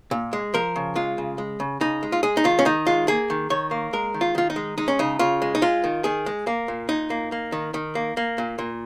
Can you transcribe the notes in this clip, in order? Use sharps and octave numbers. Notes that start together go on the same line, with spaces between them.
A#2
G#3
F3 A#4
C#3
G#3 F4
C#3
G#3
C#3
C#3 D#4
G#3
F4
G#3 G#4
D#4
D#3 F4
C#4
D#3 D#4
G#3 F4
A#3 G#4
D#3
D#3 C#5
A#3
G#3 A#4
D#3
F4
D#3 F4
D#4
G#3
G#3 D#4
C#4
C#3 D#4
C#3 F4
G#3
D#4
G#3 F4
D#3
D#3 G#4
G#3
A#3
A#2
A#2 D#4
A#3
A#3
D#3
D#3
A#3
A#3
A#2
A#2